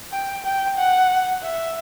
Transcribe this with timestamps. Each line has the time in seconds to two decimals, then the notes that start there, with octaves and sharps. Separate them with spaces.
0.12 G5
0.45 G5
0.77 F#5
1.42 E5